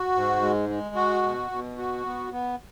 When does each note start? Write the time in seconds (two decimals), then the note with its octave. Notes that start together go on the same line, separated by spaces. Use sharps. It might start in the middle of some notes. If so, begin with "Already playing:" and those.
Already playing: F#4
0.15 G#2
0.42 G#3
0.69 G#3
0.95 F#4
1.23 B2
1.51 B2
1.78 F#4
2.06 B3
2.32 B3